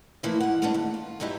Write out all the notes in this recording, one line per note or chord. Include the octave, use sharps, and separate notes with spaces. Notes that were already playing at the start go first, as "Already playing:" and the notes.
E3 F3 A3 A#3 E4
G#2 F#5
E2 G#3 A3 B3 C#4 D4
D#2
F4
G2 F#3 D#4 E4 G4